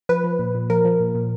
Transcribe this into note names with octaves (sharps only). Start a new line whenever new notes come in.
F3 B4
F3
A#2
A#2
F3 A#4
F3
A#2
A#2